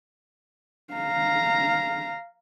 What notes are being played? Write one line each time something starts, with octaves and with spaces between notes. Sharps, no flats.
F5 A#5